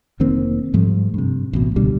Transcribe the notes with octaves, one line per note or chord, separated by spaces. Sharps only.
F1 D#3 A#3 C4
G#2 F3 G3 A3
G2 C3
A1 B2
C#2 B2 D3 G3